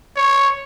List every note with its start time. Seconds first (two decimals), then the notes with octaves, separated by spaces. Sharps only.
0.17 C#5